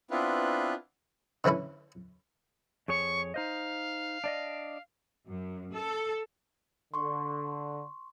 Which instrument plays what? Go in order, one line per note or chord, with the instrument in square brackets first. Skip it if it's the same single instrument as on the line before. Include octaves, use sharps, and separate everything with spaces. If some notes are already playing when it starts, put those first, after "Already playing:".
[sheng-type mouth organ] B3 C4 D4 E4 F4 B4
[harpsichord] D3 E3 C#4 E4 A4
[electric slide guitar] F2 G#4 C#5 [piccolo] C#6
[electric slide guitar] D#4 C5 D#5 [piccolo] F5
[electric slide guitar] D4 D5 D#5
[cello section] F#2
A4
[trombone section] D3 [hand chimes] C6 C#6